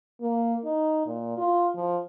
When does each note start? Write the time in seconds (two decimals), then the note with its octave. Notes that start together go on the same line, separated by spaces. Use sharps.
0.21 A#3
0.64 D#4
1.06 A#2
1.38 F4
1.75 F3